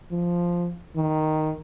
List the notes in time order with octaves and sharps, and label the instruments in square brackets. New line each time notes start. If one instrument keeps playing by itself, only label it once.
[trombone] F3
D#3